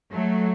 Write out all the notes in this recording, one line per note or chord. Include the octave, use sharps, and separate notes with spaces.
F#3 A3